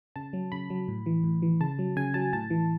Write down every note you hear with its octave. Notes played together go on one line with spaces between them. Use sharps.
C#3 A5
F#3
C#3 B5
F#3
A2
E3
A2
E3
C#3 A5
F#3
C#3 G#5
F#3 A5
A2 A5
E3